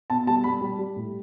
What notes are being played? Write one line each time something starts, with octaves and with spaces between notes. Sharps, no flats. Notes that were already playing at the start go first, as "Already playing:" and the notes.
B2 A5
G3 A5
G3 B5
G3
G3
A2